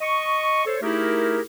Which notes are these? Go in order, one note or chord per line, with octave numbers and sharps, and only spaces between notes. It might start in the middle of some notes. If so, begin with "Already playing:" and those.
D#5 C#6
A4 C5 C#5
A3 D#4 E4 G4 G#4 A#4